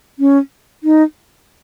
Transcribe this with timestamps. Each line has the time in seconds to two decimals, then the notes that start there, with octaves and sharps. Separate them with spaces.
0.19 C#4
0.84 D#4